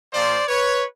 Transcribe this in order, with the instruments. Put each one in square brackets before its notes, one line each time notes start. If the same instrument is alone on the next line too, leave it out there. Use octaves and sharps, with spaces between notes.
[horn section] A#2 F3 C5 D5
B4 C#5